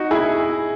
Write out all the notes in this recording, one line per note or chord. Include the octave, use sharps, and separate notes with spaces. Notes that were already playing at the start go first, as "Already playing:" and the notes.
Already playing: D#4 F#4
E4 G#4